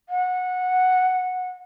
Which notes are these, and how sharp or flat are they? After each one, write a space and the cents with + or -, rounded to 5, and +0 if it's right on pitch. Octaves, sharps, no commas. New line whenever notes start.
F#5 -15